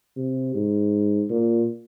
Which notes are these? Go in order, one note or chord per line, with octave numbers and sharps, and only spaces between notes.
C3
G#2
A#2